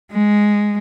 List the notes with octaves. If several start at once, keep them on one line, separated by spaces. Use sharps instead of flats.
G#3